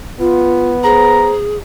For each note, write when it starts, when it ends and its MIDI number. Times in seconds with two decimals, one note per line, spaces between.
0.20 1.37 59
0.20 0.71 65
0.84 1.57 68
0.84 1.34 72
0.84 1.33 82